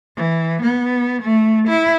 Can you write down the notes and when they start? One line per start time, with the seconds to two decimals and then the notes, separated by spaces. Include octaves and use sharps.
0.17 E3
0.62 B3
1.23 A3
1.68 E4